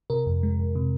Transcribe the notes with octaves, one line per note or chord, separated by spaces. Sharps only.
C3 A#4
F2
G#3
F2
C3